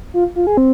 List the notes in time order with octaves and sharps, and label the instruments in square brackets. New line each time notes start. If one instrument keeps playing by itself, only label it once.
[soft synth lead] F4
F4
G#4
C4